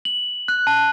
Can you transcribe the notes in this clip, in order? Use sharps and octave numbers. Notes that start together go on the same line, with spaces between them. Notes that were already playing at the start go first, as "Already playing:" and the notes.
F#7
F#6
A5